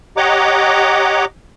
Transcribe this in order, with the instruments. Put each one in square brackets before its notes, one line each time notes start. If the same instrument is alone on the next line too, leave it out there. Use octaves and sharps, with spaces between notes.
[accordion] G4 C#5 D#5 F#5 A#5 D6